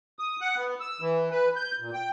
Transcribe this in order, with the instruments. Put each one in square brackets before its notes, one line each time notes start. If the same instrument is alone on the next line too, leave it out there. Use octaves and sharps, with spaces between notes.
[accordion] D#6
F#5
B3
E6
E3
B4
G6
A#2
G5